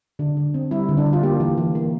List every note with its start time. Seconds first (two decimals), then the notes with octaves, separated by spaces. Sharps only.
0.19 D3 D4
0.37 D3
0.54 C4
0.71 G3 E4
0.89 D3
0.97 D4
1.06 D3
1.13 F4
1.23 A#3 G4
1.40 E3
1.58 E3
1.75 A#3